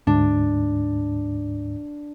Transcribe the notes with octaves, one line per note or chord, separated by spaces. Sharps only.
D2 G#2 D4